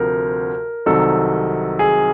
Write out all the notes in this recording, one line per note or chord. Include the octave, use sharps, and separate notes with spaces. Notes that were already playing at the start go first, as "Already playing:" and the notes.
Already playing: D2 C3 F3 A#4
C2 C3 D#3 F#3 A4
G#4